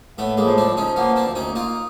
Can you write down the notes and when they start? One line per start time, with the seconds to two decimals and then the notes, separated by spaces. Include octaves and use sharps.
0.18 A2 A3 B3
0.37 G#3 A#3
0.45 F3
0.58 C4 D4
0.71 F3
0.77 C#4 D#4
0.96 A#3 B3 C#4
1.16 C4 D4
1.23 D2
1.35 C#4 D#4
1.49 A#3
1.56 D#4 F4